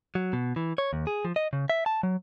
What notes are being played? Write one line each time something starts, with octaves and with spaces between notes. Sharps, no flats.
F#3
B2
E3
C#5
D#2
G#4
F3
D#5
C#3
E5
A5
F#3